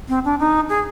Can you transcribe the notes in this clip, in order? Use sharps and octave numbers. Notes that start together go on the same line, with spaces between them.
C4
D4
D#4
G#4